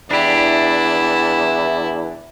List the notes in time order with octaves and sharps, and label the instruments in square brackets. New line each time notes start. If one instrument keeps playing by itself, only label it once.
[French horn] E2 [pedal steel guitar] D4 G4 [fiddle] E4